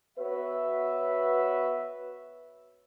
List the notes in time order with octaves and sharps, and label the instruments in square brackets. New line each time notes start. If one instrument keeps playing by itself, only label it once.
[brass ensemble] B3 F#4 B4 C#5 E5